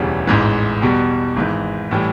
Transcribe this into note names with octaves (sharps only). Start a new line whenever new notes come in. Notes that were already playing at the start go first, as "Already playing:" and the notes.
Already playing: E1 D2 C#3 E3 G3
A1 G#2 E3
E2 B2 G3
G#1 G#2 E3
A2 E3 G3